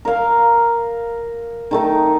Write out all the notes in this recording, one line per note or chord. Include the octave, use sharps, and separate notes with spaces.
A#4 F5
D#3 A3 D#4